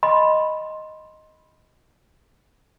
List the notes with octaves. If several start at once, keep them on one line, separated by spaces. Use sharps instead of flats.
D#5 B5 C6